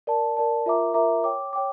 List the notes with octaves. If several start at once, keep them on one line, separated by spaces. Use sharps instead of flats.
A#4 D5 A5
A#4 D5 A5
F4 A#4 E5 A#5 D6
F4 A#4 E5 A#5 D6
C#5 G5 D6
C#5 G5 D6